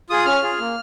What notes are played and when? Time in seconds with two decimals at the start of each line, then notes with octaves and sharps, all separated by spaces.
0.10 F4 G#4 D#6
0.25 C#4 F6
0.42 F4 G#4
0.59 A#3